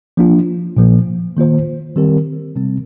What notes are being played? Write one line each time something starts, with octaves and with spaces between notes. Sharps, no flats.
F3 A#3 D4 F4
A#2 F3 A#3
D#3 A#3 F4 C5
D#3 G3 C4 G4 A#4
C3 G3 C4